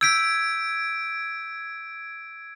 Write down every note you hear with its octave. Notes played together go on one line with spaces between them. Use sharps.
E6 G6 G#6 B6 D7